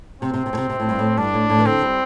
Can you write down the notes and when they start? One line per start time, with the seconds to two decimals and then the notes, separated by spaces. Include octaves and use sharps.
0.21 C3 C4
0.34 C3
0.46 C3
0.53 A2
0.57 C3
0.70 C3
0.80 A2
0.89 G2
0.99 A2
1.17 G2 D4
1.34 A2
1.49 A2
1.59 E3
1.65 D3 C4
1.82 G3